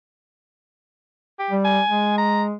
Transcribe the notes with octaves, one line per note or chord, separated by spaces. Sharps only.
G4
G3
G#5
G#3
A#5